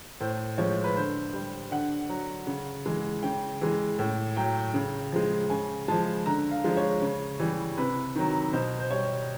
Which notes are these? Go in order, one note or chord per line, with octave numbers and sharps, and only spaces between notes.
A2 C5
F3 G#3 C#5
B4
D3 C5
G3
D3 F#5
F#3
C#3
E3 G#3
C#3 G5
E3 G#3
A2
F#3 G5
C#3
F3 G#3
C#3 G#5
F3 G#3 A5
D3 A#5
F5
F3 G#3
C#5
C#3
E3 G3
C3 B4
D#3 F#3
B2 C5
C5
G3 C#5